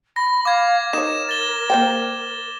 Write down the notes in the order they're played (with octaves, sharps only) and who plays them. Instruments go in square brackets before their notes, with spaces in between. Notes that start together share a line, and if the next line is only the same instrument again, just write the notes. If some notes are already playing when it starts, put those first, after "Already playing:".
[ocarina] B5 [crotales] A#6
[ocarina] F5 [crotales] D6 G#6
[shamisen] D#4 C#5 [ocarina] A#4 [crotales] E7
[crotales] A6 G7
[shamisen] A#3 C5 G5